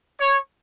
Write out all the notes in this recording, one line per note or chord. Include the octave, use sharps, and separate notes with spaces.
C#5